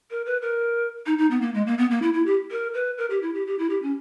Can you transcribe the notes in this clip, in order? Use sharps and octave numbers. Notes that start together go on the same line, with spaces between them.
A#4
B4
A#4
D#4
D#4
B3
A#3
G#3
A#3
B3
A#3
E4
E4
G4
A#4
B4
A#4
G4
E4
G4
G4
E4
G4
C#4